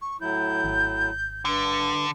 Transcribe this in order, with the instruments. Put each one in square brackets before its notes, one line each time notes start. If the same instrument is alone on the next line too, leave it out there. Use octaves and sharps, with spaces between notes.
[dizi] C#6
[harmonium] A2 F#3 E4 [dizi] G6
[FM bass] G#1
[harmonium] G2 [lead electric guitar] D3